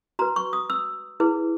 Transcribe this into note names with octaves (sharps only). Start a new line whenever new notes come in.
F#4 B4 A#5
C#6
D#6
E6
E4 G#4 B4